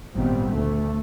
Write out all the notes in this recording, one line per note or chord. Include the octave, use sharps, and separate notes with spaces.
G#1 A#2 D#3 G3 B3 C4
D2 A3